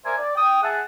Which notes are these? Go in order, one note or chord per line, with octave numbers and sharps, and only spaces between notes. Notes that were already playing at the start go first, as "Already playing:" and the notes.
A#4 C5 D5 E5 G#5
D5
G5 D#6
G#4 E5 F#5 A5